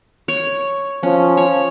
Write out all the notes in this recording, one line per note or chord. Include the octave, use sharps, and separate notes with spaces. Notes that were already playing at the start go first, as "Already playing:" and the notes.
C#5
F3 C#4
C#5